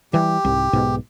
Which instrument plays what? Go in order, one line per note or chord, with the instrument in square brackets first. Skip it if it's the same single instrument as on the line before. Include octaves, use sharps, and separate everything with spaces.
[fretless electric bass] E3 G3 [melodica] G4
[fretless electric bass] C2 G#2
B1 G#2 B2